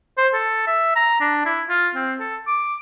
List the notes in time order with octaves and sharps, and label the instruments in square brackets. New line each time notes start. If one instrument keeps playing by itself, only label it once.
[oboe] C5
A4
E5
A#5
D4
E4
F4
C4
A4
D6